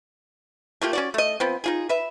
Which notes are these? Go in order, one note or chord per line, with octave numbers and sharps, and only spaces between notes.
A3 A#3 F4 G4
C#4 F#4 D5
A3 D#5
F3 B3 C4
D#4 F4 G#4
B4 E5